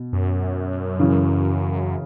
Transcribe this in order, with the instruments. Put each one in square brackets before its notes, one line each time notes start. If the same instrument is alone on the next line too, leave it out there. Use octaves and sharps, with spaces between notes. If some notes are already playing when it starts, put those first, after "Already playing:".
Already playing: [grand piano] B2
[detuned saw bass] F#2
[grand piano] C#3 E3